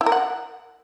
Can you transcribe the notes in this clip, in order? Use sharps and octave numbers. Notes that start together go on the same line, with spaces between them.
E4
A#4
F#5